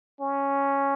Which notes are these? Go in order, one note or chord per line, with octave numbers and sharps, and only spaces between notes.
C#4